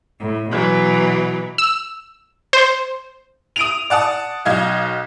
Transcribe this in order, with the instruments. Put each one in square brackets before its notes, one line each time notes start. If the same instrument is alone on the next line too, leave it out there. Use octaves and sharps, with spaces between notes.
[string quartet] A2
B2 E3 F#3
[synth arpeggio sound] E6
C5
[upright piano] D#6 D7 D#7 F7
D5 F#5 A5 D#6
B1 D#5 F5 G#6